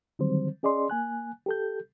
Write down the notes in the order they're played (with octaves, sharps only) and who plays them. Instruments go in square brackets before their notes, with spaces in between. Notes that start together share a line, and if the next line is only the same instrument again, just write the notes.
[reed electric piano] D3 D#3 F#3 G3 C4 C5
C#4 G#4 D5 D#5 C6
A#3 G#5 F#6
G4 A4 G6